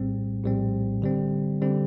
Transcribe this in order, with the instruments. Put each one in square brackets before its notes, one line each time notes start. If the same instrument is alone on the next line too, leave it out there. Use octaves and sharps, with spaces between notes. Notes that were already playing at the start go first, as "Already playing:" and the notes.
Already playing: [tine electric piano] A#1 A2 G3 C4
A#1 A2 G3 C4
D3 G3 C4
D3 G3 C4